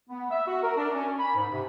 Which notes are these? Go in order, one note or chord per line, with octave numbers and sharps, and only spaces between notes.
B3
E5
F#4
A#4
D4
C#4
B5
G#2
C3